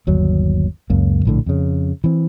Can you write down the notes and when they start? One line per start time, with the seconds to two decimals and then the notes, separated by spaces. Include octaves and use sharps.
0.07 G1 D#2 F#3
0.90 C#2 F#2 C#3 A#3
1.25 A#1 A2 D3
1.46 F2 C#3
2.04 E3 C4